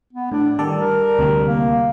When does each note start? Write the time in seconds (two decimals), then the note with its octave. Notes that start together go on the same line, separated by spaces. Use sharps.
0.13 B3
0.32 A2 D4
0.59 D#3 G3 A4 D5
0.77 A#4
1.19 D2 C3 G3
1.44 A#3